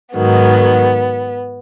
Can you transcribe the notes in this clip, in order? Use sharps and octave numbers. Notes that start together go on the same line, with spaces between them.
G#2 D#3 F#3 B3